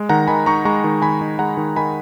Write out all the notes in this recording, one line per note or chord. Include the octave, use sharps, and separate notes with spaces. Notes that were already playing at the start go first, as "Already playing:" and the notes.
Already playing: G#3
D#3 F#5 A#5
D#3 G#5 B5
D#4 A#5 C#6
G#3 A#5 C#6
D#3
D#3 G#5 B5
D#4
G#3 F#5 A#5
D#3
D#3 G#5 B5